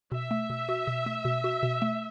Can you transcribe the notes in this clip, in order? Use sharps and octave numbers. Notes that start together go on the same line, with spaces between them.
B2 E5
A3
B2
F#4
B2
A3
B2
F#4
B2
A3